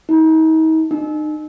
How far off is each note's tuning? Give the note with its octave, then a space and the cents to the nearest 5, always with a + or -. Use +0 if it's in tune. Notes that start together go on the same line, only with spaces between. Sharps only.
D#4 +40
D#4 -35